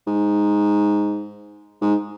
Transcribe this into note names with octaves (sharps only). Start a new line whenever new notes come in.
G#2
G#2